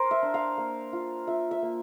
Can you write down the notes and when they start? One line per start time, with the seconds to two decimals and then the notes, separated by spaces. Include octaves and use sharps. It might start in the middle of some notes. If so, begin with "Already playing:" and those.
Already playing: A#4 C5
0.11 E5
0.22 D4
0.34 F5
0.57 A#3
0.93 F4
1.27 F4 E5
1.51 E5
1.62 A#3